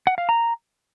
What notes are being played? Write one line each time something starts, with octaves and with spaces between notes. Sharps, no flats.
F#5
F5
A#5